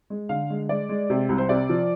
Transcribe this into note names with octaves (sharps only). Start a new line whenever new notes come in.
G#3
D3 F5
G#3
G#3 D5
G#3
C3
C2
C5
C3 D5
F3